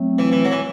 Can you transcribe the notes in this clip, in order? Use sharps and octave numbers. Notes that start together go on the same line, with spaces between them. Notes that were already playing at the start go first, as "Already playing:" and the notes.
Already playing: F#3 A3 C4
E3
E3
F#3
E3